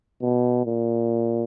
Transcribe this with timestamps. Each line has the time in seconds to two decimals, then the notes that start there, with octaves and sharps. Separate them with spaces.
0.22 B2
0.66 A#2